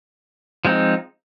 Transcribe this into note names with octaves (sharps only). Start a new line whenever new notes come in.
F3 G#3 C4 D#4